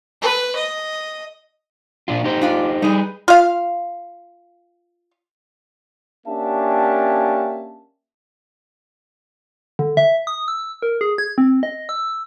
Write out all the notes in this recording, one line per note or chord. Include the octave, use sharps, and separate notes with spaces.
B4
D#5
A#2 D4 F4
D#4 G4 C5
D4 F4 D5
G3 D#4 G#4 B4
F4 F5
A#3 C#4 D4 G4 E5 A5
D3
E5
D#6
E6
A#4
G#4
G#6
C4
D#5
E6